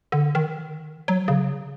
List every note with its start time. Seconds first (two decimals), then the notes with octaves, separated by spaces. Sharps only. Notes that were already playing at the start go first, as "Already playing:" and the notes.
0.12 D3
0.35 D#3
1.08 F#3
1.28 C#3